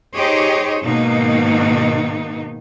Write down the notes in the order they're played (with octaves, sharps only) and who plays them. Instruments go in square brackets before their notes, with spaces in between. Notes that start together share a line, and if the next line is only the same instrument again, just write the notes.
[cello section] D#4 G4 G#4 C5 C#5 D#5
G#2 B2 D#3 A#3 D#4